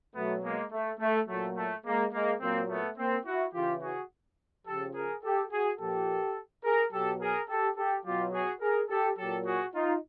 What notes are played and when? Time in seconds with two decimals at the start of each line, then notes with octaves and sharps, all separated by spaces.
0.15 B2 F#3 A3 B3
0.44 G#3 A#3
0.72 A3
1.00 A3
1.28 A#2 F#3 A3
1.56 A3
1.85 G#3 A#3
2.13 G#3 A#3
2.41 A#2 F#3 A#3 C4
2.69 A3 B3
2.97 A#3 C4
3.25 E4 F#4
3.53 C#3 E3 F4 G4
3.82 F#4 G#4
4.66 C#3 F3 G4 A4
4.94 G#4 A#4
5.23 G4 A4
5.51 F#4 G#4
5.79 A#2 F3 G4 A4
6.64 G#4 A#4
6.92 B2 F#3 G4 A4
7.20 G#4 A#4
7.48 G4 A4
7.76 G4 A4
8.04 B2 F#3 F4 G4
8.33 F#4 G#4
8.61 G#4 A#4
8.89 G4 A4
9.18 A#2 F#3 G4 A4
9.45 F#4 G#4
9.74 D#4 F4